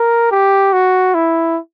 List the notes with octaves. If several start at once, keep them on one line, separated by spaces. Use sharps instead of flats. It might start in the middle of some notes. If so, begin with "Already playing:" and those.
Already playing: A#4
G4
F#4
E4